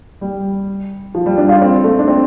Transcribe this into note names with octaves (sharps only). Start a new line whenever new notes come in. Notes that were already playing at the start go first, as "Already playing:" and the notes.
G3
F3
G3
D4
F4
C4
A3
D4
C4